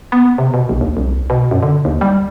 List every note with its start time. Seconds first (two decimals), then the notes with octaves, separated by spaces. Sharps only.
0.12 B3
0.38 C3
0.54 B2
0.69 A#1
0.81 D#2
0.97 C2
1.30 B2
1.51 F#2
1.63 D3
1.85 D#2
2.01 G3